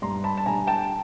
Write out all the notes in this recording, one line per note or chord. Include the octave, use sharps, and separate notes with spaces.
G2 A#5 C6
A5 B5
A5
D3 G3 G#5 A#5
G5 A5